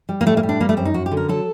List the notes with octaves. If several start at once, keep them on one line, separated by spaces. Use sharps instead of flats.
G3
A#3
A2 A3
A#3
G3
D4
G3 A#3
A3
F#2 C4
D#4
F#2 F#4
G4
D3
A#4
F#3 A4